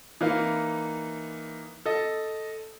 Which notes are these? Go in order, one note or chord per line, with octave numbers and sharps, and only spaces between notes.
E3 A#3 D#4 F5
A4 D#5